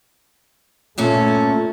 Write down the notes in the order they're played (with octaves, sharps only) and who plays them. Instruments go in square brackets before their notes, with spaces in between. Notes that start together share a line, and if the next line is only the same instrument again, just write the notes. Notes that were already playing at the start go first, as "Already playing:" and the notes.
[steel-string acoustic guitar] G2 A#2 C#4 [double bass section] A3 [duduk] A4